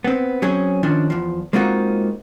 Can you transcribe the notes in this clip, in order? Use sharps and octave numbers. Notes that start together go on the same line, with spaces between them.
B3 C4
F#3 C4 C#4 G#4
D#3 F3 C#4 D4
E2 F3
G#3 A#3 C4 D#4 F4 F#4